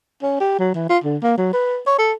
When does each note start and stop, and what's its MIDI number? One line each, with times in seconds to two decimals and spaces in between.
0.22 0.38 61
0.40 0.56 67
0.59 0.72 54
0.74 0.88 52
0.89 0.98 65
1.04 1.17 50
1.23 1.35 58
1.38 1.52 54
1.53 1.79 71
1.87 1.97 73
1.98 2.13 69